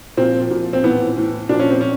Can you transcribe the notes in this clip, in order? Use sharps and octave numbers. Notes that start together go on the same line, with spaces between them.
A#2 F3 C4
A#2 F3
C4
A2 E3 B3
A2 E3
A#2 F3 D4
C#4
C4
C#4